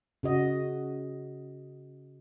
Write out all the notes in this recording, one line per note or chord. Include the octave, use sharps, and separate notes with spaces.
C#3 F#4 D#5